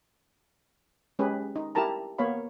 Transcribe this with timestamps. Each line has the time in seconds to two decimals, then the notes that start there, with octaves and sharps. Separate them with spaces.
1.19 G#3 C#4 G4 G#4 B4
1.56 D#4
1.75 E4 G4 A#4 A5 A#5
2.18 A#3 B3 C#5 F5 B5